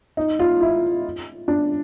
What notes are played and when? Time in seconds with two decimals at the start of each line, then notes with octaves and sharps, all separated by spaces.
0.17 D#4
0.39 F4
0.61 E4
1.48 D4